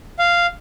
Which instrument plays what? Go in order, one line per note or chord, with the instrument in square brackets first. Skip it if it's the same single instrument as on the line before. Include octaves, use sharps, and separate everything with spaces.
[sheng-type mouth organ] F5